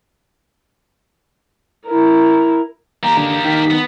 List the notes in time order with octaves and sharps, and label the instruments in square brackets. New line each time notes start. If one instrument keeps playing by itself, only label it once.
[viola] E4 A#4
[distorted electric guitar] A#3 G4 [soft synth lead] A#5
[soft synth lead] D3
[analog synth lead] D#3 [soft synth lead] B6
[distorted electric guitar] B3